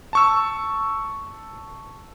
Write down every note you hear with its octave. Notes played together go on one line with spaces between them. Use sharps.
A5 C#6 E6